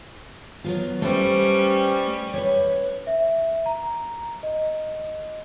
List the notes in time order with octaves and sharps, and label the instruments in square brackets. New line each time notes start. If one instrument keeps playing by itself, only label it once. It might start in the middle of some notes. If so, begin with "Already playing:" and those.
[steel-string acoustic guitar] F#3 B3 F4
[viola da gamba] G3 C#4 [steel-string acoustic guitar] A3 B4 C5
[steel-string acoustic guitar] B4 C#5
[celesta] E5
A#5
D#5